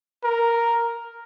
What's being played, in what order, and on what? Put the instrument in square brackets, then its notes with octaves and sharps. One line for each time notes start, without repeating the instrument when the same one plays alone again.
[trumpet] A#4